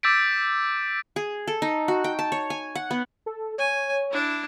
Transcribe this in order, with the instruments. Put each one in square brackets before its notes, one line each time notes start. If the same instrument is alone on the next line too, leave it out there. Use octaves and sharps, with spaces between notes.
[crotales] D6 E6 G6 A6 B6 D7
[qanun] G#4
A4
D#4
F#4
G5
A5
C#5
G#5
F#5
B3
[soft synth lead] A4
[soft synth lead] C#5 [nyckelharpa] G#5
[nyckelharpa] D4 E4